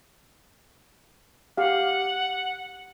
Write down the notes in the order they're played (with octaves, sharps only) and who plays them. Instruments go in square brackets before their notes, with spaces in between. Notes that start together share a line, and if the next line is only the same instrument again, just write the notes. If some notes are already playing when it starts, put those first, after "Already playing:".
[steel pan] G4 F5 [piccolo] F#5